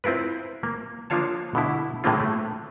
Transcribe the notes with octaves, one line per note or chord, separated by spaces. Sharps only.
C4 E4 F4 A#4 B4
A#3
F3 A#3 D4 F4 C#5 A5
B2 D3 E4
A2 D3 G#3 A#3 C4 F4
A3